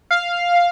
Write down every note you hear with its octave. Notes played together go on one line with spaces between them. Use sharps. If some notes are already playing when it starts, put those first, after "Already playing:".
F5